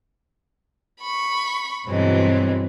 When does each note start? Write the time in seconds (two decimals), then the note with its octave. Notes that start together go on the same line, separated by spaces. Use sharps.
1.00 B5 C#6
1.87 G2 B2 E3 F#3 G#3 C4